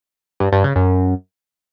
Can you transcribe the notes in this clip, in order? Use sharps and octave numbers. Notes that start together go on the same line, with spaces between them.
G2
G2
C#3
F#2